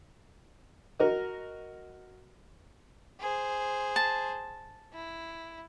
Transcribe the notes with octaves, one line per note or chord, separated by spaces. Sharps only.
F#4 A#4 D#5
G#4 C5
A5
E4